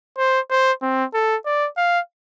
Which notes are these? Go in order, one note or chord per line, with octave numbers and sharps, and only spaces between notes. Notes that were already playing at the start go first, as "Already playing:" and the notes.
C5
C5
C4
A4
D5
F5